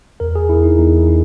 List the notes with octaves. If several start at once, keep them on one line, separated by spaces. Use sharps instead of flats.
E2 A#4
G#4
E2 E4
D#4
E2 D#4
D#4